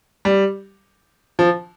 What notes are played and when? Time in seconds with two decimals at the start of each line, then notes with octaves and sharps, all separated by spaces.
0.25 G3
1.39 F3